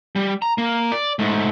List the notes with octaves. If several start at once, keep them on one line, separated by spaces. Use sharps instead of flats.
G3
A#5
A#3
D5
G#2 A3